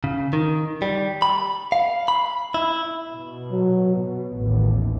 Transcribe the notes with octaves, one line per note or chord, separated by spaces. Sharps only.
C#3
D#3
G3
B5
F5
B5
E4
B2
F#3
B2 B3
A1 D#2